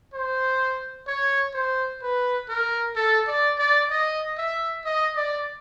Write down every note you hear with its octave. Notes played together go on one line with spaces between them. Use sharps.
C5
C#5
C5
B4
A#4
A4
D5
D5
D#5
E5
D#5
D5